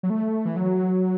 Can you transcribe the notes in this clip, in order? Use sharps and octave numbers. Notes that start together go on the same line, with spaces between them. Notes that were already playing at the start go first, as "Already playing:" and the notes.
F#3
A3
E3
F#3